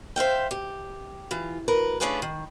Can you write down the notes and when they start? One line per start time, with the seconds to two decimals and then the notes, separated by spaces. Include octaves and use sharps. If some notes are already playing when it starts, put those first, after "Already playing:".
0.16 C5 E5 F5 G5
0.51 G4
1.31 E3 F4
1.68 D2 A#4 B4
2.00 A3 C#4 D4 F4 G#4 B4
2.22 D#3